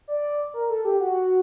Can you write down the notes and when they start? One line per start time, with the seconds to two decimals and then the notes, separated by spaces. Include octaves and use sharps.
0.08 D5
0.54 A#4
0.70 A4
0.85 G4
1.00 F#4